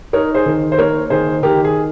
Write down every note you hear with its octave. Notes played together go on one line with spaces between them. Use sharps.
D#4 A#4 C#5
G#4 C5
D#3
C5
A#3 A#4 C#5
D#3 G#4 C5
D#3 G4 A#4
G#4